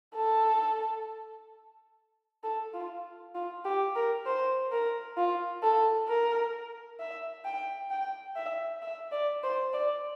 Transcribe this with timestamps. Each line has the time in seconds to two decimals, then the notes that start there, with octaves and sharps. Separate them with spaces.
0.16 A4
2.44 A4
2.74 F4
3.35 F4
3.65 G4
3.96 A#4
4.26 C5
4.72 A#4
5.17 F4
5.63 A4
6.08 A#4
7.00 E5
7.45 G5
7.91 G5
8.36 E5
8.82 E5
9.12 D5
9.43 C5
9.74 D5